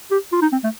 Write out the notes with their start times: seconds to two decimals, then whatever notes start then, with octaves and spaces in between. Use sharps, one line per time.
0.11 G4
0.32 F4
0.42 D#4
0.52 C4
0.64 A3